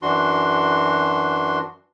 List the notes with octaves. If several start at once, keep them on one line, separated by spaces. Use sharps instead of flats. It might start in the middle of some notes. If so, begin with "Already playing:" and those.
F#2 E3 D4 F#4 C6